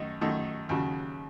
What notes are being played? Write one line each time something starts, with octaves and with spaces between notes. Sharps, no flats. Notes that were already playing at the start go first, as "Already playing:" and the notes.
Already playing: F#2 D#3 A3 D#4
F#2 D#3 A3 D#4
D#2 C#3 F#3